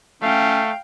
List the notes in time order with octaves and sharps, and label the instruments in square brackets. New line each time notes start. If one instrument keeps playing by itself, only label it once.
[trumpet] A3 [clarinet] C#4 [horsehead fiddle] F5 G5